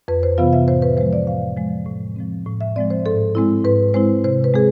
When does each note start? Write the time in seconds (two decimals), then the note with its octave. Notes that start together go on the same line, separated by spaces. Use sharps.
0.08 F2 B4
0.23 C5
0.38 C3 E3 B3 F4 F5
0.53 E5
0.68 A2 C5
0.82 B4
0.97 F3 G#3 C5
1.13 D5
1.27 A2 F5
1.57 F3 G#3
1.86 A2
2.16 F3 G#3 C4
2.46 A2
2.61 E5
2.76 F3 G#3 C4 D5
2.90 C5
3.06 G#2 A4
3.35 G#3 C4 E4
3.65 G#2 B4
3.94 G#3 C4 E4 C5
4.24 C3 C5
4.44 B4
4.54 G#3 C4 G#4